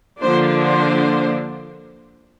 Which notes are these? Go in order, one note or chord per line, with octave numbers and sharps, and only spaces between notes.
D3 F3 A#3 D4 C5
C5